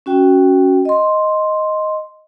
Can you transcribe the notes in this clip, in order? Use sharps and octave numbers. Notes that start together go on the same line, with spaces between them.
C#4 F#4 G5
D#5 C6